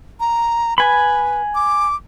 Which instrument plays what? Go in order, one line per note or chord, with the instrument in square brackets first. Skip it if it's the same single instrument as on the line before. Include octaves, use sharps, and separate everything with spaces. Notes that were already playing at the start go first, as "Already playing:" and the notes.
[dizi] A#5
[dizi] B4 [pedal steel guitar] G#5 B5
[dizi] D6